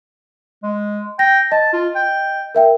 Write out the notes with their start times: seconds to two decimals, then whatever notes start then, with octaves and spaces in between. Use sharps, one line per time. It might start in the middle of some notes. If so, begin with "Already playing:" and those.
0.63 G#3
1.19 G5 A#6
1.52 D#5 A5
1.73 F4
1.96 G5
2.55 A#4 E5 G5